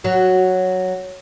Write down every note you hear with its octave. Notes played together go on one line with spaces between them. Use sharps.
F#3 F#4